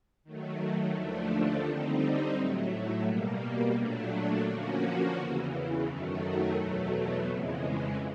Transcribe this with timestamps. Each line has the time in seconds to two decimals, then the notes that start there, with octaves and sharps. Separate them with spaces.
0.24 D#3 F#3 A3
0.94 D#2 D3 F3 A3 D4
1.64 D3 G3 C4 D#4
2.35 A2 F#3 A3
3.05 B2 G3 A#3
3.75 A#2 F#3 A3 D4
4.44 D3 F3 A#3 C#4 F#4
5.15 E2 C#3 E3
5.86 F#2 D#3 F#3 A3
6.55 E2 B2 F#3 A3
7.25 F2 C#3 E3 G#3